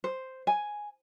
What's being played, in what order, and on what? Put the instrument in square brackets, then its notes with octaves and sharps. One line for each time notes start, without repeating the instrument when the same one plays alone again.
[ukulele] C5
G#5